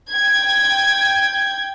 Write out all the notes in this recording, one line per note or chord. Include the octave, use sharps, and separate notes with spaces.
G5 G#6